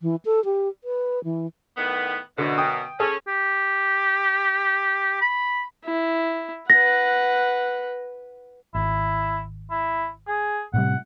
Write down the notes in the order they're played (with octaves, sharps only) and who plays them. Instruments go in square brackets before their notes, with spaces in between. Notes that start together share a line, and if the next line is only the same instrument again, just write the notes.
[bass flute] E3
A4
G4
B4
E3
[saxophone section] A2 D#3 B3
[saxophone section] F#2 B2 [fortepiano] D3
[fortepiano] G5 D#6
[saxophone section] C#4 [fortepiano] G#4 A4
[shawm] G4
B5
[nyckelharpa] E4
[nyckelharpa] B4 F#5 [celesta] A#6
[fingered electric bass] G#1 [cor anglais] E4
[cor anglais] E4
G#4
[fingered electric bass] A2 C3 G3 [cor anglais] F#5